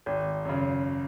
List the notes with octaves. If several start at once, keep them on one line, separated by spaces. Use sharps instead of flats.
G#1
F#2 C#3